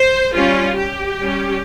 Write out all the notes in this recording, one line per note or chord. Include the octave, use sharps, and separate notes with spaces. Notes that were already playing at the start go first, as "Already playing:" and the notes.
Already playing: C5
G3 C#4 F4
G4
G3 C#4